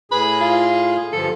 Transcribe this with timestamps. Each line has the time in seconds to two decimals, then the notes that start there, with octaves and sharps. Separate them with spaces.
0.11 A2 G#4 B5
0.40 F4
1.13 G2 D3 F3 A4